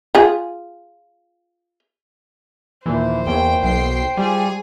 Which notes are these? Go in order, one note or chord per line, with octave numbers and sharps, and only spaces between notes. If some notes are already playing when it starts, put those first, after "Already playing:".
F4 G#4
D#2 A#2 E3 C5
E2 E3 A#3 C#5 G5
B1 G5 C7
G3 F4 G4 G#4 G#5